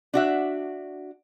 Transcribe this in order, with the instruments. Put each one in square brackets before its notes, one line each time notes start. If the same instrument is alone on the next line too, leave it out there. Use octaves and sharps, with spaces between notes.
[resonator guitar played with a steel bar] D4 F#4 E5